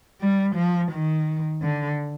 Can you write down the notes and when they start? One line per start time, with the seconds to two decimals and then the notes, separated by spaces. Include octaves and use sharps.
0.21 G3
0.56 F3
0.91 D#3
1.62 D3